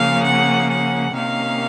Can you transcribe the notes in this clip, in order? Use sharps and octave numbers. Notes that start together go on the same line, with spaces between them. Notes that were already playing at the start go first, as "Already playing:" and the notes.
Already playing: C#3 F3 A#3 F5
F#5
F#5
C3 D#3 A#3 C#4 F5